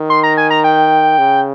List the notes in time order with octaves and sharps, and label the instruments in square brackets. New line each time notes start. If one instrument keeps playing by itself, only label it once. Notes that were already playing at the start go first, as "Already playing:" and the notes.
Already playing: [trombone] D#3
[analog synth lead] C6
A#5
G#5
A#5
G5
[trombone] C#3